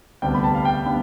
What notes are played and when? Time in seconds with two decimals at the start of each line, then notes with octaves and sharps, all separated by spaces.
0.22 D2 C3 G3 B3 D4 G5
0.34 B5
0.44 A5
0.55 F5
0.65 G5
0.86 G3 B3 D4 B5